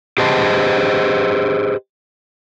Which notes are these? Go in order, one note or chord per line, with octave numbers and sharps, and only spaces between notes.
G4 G#4 B4 C5 D#5 A5